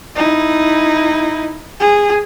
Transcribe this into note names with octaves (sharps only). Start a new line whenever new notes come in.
D#4 E4
G#4